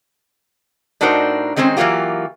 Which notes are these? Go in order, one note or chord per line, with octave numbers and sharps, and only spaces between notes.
A2 D4 D#4 F#4 A#4 C5
D#3 G#3 C4 C#4 C5
E3 F#3 A#3 F4 G4